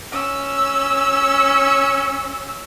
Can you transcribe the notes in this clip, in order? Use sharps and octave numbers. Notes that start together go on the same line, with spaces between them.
C#4 E6